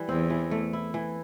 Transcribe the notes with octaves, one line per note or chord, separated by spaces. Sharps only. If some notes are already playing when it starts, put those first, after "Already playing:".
Already playing: E3 G3
E2 C4
E3
A3
E4
E3